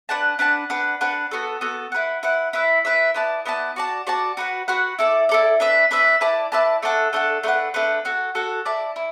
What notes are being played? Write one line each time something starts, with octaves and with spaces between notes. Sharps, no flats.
D4 B4 F#5 A5
D4 B4 F#5 A5
D4 B4 F#5
D4 B4 F#5
B3 F#4 A4
B3 F#4 A4
E4 B4 F#5
E4 B4 F#5
E4 B4 E5
E4 B4 E5
B3 E4 D5 A5
B3 E4 D5 A5
F#4 D5 A5
F#4 D5 A5
F#4 B4 F#5
F#4 B4 F#5
E4 A4 D5
E4 A4 D5
D4 B4 E5
D4 B4 E5
E4 B4 D5 A5
E4 B4 D5 A5
A3 D4 A4 F#5
A3 D4 A4 F#5
A3 D4 B4 F#5
A3 D4 B4 F#5
F#4 A4 F#5
F#4 A4 F#5
E4 D5 A5
E4